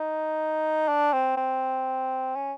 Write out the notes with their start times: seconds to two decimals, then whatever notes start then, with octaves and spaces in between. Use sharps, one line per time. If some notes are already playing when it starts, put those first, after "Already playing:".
Already playing: D#4
0.89 D4
1.13 C4
1.37 C4
2.36 C#4